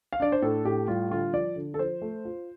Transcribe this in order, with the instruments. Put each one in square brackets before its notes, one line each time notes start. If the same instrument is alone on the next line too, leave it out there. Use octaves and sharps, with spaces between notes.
[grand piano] F5
[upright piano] D4 [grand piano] D5
[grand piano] C5
[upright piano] A2 [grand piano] A4
[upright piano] A2 [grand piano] G4
[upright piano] G3 [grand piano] F4
[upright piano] D3 [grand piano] F4
[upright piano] F3 [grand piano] D5
[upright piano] D3
[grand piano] A4
[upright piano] F3 [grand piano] C5
[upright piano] A3
F4